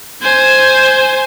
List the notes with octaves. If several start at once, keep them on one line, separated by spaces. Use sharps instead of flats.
C5 G#5